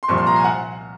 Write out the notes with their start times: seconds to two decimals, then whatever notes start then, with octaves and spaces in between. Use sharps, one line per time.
0.03 C6
0.08 C2 A#2 F3 C#6
0.18 C6
0.27 A#5
0.36 G#5
0.44 F#5